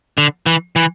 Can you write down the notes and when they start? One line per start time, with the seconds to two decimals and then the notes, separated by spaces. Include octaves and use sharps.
0.18 D3
0.46 E3
0.76 E3